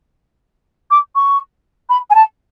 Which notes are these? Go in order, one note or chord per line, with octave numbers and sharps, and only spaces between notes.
D6
C#6
B5
G#5
A5